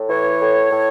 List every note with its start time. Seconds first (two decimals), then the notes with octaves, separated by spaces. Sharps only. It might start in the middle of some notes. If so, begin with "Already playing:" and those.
Already playing: A2
0.09 E3 C#5
0.40 A2
0.71 A2